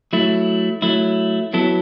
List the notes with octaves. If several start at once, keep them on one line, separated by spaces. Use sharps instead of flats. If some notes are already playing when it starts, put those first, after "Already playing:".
F#3 A3 E4
F#3 A3 E4
F#3 B3 E4 A4